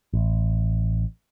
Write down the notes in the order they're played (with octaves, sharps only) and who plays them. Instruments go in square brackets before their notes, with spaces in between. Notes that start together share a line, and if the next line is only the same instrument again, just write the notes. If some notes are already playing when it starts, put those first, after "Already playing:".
[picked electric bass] A1